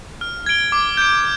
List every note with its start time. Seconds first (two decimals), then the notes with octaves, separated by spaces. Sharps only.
0.21 F6
0.46 G#6 D7 G7
0.72 D6
0.97 G6 D7